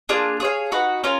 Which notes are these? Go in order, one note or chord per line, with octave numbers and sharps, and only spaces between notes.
A#3 D4 F4 G#4
G#4 C#5 F5
D#4 F#4 B4
C#4 F4 A#4